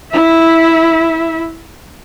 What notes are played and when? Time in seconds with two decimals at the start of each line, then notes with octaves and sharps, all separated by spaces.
0.11 E4 E5